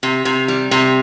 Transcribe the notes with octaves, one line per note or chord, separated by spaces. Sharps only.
C3
C3
G3
C3